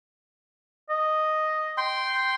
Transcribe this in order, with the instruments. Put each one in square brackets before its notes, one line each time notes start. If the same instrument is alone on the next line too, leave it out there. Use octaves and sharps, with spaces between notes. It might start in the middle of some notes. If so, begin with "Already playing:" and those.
[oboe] D#5
[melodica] G5 C6